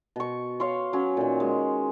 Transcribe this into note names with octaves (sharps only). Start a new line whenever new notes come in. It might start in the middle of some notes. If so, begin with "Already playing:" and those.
B2 C#6
C#5 F5 C6 C#6
F#3 C#4
A#2 D#3
G#3